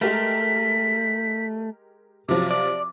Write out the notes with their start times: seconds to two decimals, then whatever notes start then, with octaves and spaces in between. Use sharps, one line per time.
0.01 G#3 A3 G4 A#4 B6
2.29 C3 F3 F#3 D6
2.51 D5 D6